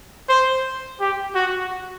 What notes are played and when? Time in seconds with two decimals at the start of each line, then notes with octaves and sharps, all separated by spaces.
0.29 C5
1.01 G4
1.35 F#4